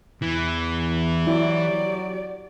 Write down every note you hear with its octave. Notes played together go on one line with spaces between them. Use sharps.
E2 E3
F#3 E4 G4 D5